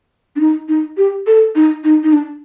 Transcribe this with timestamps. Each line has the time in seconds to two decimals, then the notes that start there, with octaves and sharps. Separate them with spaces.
0.36 D4
0.40 D#4
0.69 D#4
0.97 G4
1.27 A4
1.55 D#4
1.84 D#4
2.03 D#4
2.13 D4